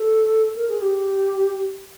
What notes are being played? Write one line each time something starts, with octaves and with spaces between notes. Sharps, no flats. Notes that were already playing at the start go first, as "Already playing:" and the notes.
Already playing: A4
A#4
G#4
G4